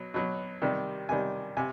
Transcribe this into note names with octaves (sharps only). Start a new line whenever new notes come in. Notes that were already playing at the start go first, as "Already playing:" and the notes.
Already playing: B2 F#3
B2 F#3
C3 D#3 G3
C3 D#3 G3 G#5
C3 G#5